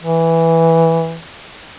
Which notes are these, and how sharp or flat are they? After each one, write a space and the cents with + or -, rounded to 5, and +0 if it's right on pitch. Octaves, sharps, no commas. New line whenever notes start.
E3 -5